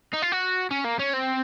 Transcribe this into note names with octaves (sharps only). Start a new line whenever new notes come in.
D#4
F4
F#4
C#4
A#3
C#4
C4